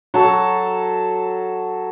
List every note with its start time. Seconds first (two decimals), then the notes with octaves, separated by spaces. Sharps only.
0.14 F#3 A4